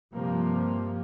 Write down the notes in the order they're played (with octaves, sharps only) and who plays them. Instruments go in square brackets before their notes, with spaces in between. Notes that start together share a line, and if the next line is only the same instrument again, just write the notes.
[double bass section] G2 C3 F3 A#3